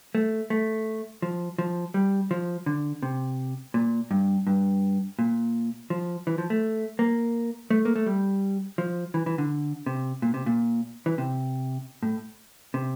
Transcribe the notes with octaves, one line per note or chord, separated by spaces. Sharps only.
A3
A3
F3
F3
G3
F3
D3
C3
A#2
G2
G2
A#2
F3
E3
F3
A3
A#3
A3
A#3
A3
G3
F3
E3
E3
D3
C3
A#2
C3
A#2
E3
C3
A2
C3